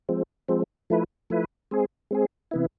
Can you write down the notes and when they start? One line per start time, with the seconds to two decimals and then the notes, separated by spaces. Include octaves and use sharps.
0.09 F3 G#3 C4
0.49 F3 G#3 C4
0.90 F3 A3 E4 B4
1.30 F3 A3 E4 B4
1.71 G#3 C4 G#4
2.11 G#3 C4 G#4
2.51 C3 E3 B3 E4